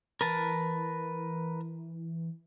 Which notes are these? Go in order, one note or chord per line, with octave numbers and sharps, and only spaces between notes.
E3 A#4 B4 A5